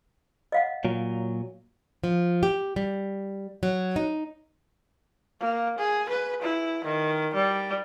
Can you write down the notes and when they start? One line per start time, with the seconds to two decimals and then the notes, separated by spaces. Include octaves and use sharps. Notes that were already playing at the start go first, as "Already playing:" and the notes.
0.52 D#5 F5 F#5
0.85 A#2 F#3
2.04 F3
2.43 G4
2.76 G3
3.63 F#3
3.96 D#4
5.40 A#3
5.78 G#4
6.09 B4
6.42 E4
6.85 D#3
7.34 G3